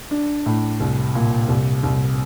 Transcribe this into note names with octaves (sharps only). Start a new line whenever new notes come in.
D4
A2
C2
A#2
C2
C2